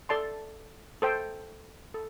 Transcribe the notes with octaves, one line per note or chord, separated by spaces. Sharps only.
A4 D5 A5 C6
A4 C5 G5
A4